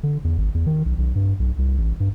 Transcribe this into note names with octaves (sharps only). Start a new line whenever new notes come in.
D3
E2
G#1
E2
D#3
B1
B1
G2
B1
C2
A1
G2